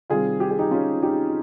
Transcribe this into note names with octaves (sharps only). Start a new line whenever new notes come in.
C3 D#3 G3 C4 F4 G#4
G4
G#4
D#4 G4
C#4 F4
D#4 G4